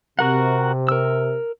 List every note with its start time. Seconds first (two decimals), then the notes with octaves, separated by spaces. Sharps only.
0.19 C3 F#4 A#4 F#5
0.89 A#4 E6